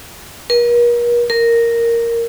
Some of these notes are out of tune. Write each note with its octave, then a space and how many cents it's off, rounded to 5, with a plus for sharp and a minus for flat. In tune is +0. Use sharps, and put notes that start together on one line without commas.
A#4 +40
A#4 -5